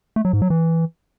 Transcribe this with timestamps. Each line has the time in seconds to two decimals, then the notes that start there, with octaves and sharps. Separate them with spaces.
0.16 A3
0.25 F#3
0.33 G#2
0.42 F#3
0.50 E3